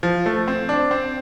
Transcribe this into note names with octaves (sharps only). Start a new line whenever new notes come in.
F3
A3
C4
D4
C4